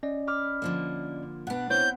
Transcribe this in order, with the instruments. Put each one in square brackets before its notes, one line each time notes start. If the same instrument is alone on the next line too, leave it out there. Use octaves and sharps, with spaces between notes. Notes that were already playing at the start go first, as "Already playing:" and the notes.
[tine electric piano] C#4 D5 D#5
[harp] B5 D6 F6
[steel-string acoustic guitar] D3 F3 A#3
[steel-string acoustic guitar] B2 D4 [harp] B3 F#5
[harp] B3 C4 [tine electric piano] E4 C5 C#5 [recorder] G6